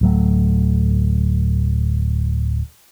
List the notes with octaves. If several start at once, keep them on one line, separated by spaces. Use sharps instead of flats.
D1 F#3 A3